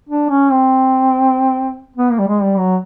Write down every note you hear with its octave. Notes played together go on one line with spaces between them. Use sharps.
D4
C#4
C4
B3
A#3
G3
G#3
G3
F#3